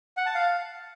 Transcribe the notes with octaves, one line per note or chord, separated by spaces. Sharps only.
F#5
A5
F5